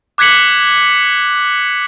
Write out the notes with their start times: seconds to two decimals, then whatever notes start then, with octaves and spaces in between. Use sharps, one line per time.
0.18 D6 F#6 G#6 B6 C#7 F#7